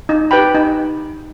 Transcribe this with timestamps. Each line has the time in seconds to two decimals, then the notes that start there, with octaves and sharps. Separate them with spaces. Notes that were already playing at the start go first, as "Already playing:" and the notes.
0.09 D#4
0.31 G4 B4 G5 B5
0.55 D#4